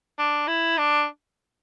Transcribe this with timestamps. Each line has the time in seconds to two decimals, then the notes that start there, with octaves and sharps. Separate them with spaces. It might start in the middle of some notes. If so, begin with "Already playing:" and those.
0.19 D4
0.48 E4
0.78 D4